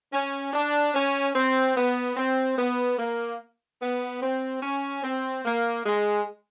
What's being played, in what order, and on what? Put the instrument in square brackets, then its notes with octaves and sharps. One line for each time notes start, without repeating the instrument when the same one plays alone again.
[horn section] C#4
D4
C#4
C4
B3
C4
B3
A#3
B3
C4
C#4
C4
A#3
G#3